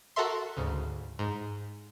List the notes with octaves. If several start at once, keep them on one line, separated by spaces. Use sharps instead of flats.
F#4 A4 A#4 E5 C6
D2 G#2 C#3
G#2